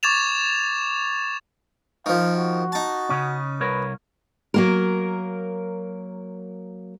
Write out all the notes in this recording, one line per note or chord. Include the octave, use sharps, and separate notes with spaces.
C#6 D6 G#6 A6 E7 F7
D#3 F3 F5
F#4
D#4 A5
C#3 C#4
C2 A#4 B4 C#5
F#3 A#3 A#4